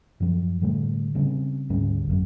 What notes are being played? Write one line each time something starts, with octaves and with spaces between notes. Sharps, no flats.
F#2 F3
A2 D3 G3 A3
C#3 G3 C4 C#4
D2 G#2 G3 C#4
G#1 F#2